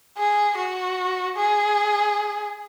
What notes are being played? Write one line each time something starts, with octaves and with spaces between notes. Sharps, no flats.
G#4
F#4
G#4